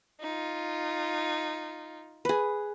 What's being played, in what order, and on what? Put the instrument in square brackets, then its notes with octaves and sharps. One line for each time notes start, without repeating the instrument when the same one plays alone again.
[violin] D#4 F4
[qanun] G#4 B4